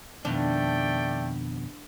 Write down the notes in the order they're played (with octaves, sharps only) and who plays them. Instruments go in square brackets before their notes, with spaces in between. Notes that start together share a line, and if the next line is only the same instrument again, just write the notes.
[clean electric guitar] F2 B2 D#3 [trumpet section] A3 D5 G5 [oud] D4